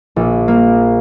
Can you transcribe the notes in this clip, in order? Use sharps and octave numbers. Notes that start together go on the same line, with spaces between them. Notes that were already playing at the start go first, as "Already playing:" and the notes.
A#1
A#3